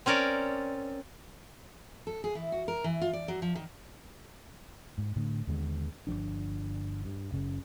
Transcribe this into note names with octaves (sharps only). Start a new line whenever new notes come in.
C4 C#4 A#4 C#5 D5
A4
G#4
E3
F#4
A#4
E3
F4
D5
F#3
F3
D#3
G#2
A2 D3
D#2 D3 G#3 B3
G1 D#2 F3 D4
G2
F#1 C#3